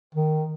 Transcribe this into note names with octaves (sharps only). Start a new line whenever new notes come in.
D#3